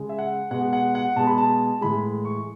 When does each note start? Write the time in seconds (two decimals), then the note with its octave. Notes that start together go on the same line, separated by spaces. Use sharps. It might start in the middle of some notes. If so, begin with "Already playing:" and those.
Already playing: C#3 G#3
0.09 E5
0.19 F#5
0.51 B2 G#3 F#5
0.73 F#5
0.95 F#5
1.16 B2 G#3 A5
1.27 B5
1.38 A5
1.81 A2 E3 G#3 B5
2.25 C#6